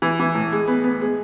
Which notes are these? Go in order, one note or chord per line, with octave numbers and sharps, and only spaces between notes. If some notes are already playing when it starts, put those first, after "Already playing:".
E3
E3
A2
G#3
B3
B3
G#3